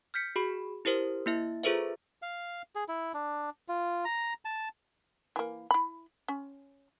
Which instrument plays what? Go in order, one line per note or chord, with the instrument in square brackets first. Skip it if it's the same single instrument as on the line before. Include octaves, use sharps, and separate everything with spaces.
[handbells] F6 G6 B6 C#7
F#4 G#4 B5
E4 G4 A#4 C5
A#3 E4 E5
F4 G#4 A4 B4 C5 E5
[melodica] F5
G#4
E4
D4
F4
A#5
A5
[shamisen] E3 A#3
E4 B5
C#4